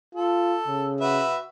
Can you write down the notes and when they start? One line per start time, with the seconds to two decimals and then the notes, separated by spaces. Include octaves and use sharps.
0.15 F4 A4
0.68 C#3
1.00 F#4 B4 E5